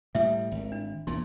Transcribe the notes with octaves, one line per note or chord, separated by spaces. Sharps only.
A2 G3 E5
G#1
D4
A#1 E2 A#2 C6